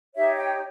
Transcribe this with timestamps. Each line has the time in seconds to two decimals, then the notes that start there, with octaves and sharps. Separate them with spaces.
0.15 D#4 G4 C#5 E5
0.36 G5